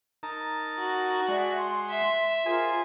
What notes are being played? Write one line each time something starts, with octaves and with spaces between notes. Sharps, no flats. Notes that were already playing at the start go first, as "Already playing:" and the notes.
D#4 A#4 A5
F#4
G#3 D5 E5 F#5 A5
C6
E5
F4 G#4 A#4 C5 G#5